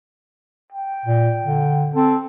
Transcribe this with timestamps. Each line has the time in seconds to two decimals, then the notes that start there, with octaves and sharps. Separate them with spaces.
0.72 G5
1.05 A#2
1.44 D3
1.95 C4 A4